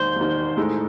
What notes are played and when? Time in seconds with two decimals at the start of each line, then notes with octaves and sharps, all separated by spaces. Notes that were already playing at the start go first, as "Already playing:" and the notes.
Already playing: E1 D#2 D#3 C5
0.16 E1 D#2 D#3
0.57 A2 G#3 D#4 A4